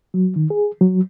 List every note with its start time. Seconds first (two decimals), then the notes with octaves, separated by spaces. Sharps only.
0.14 F#3
0.36 D#3
0.50 G#4
0.81 F#3